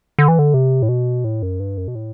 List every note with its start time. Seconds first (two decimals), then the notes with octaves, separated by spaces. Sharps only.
0.19 D3
0.28 E3
0.39 D3
0.54 C3
0.82 A2
0.89 B2
1.24 A2
1.43 F#2
1.60 G2
1.77 F#2
1.88 B2
1.95 A2